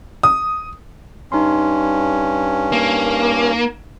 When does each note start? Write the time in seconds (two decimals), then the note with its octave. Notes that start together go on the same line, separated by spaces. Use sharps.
0.23 D#6
1.32 G2 C#4 D#4 C6
2.72 A#3